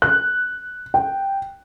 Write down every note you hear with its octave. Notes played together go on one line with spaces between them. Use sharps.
F#6
G5